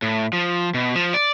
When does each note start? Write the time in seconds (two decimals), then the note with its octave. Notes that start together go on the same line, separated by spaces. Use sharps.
0.02 A2
0.33 F3
0.74 B2
0.95 F3
1.14 D5